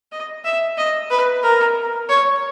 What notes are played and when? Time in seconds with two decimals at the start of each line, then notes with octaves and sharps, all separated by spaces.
0.12 D#5
0.45 E5
0.77 D#5
1.10 B4
1.43 A#4
2.09 C#5